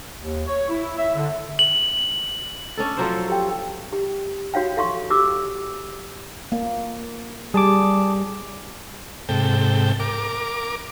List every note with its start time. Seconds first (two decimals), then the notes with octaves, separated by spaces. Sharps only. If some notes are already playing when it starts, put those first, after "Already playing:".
0.20 D#2
0.47 C#5
0.69 E4
0.97 E5
1.15 D3
1.59 F#7
2.77 C#4 D4 A4
2.97 F3 F#3 A4 C5
3.29 G4 G5
3.93 G4
4.54 F#4 C#5 F5 G5
4.77 A4 F5 C6 C#6
5.10 G4 D6 E6
6.52 A#3
7.54 G3 G#4 A5 D6
9.29 G#2 C3 A4 G5
10.00 A#4 D6